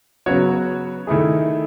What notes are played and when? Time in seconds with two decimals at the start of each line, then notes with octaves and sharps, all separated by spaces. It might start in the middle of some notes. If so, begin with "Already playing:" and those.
0.26 C#3 F#3 B3 F#4 C#5
1.07 D#3 A3 E4 G#4